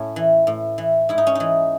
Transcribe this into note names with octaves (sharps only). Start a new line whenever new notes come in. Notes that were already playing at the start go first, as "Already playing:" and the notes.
Already playing: A2 C#4
E3
A2
E3
G#2 E4
D#4
C#4
E3 D#4